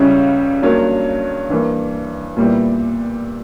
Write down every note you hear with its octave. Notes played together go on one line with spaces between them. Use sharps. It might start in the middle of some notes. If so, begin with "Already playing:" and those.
Already playing: C#2 C#3 G3 C#4 E4
G2 F#3 A#3
G2 E3 A#3
A#2 G3 B3 E4